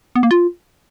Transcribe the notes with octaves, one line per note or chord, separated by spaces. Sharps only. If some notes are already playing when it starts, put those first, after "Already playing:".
B3
A#3
F4